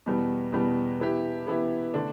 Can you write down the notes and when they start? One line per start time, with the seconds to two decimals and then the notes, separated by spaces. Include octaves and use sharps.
0.06 E2 B2 G3 B3
0.52 E2 B2 G3 B3
1.00 E3 B3 E4 G4
1.47 E3 B3 E4 G4
1.94 D3 A3 D4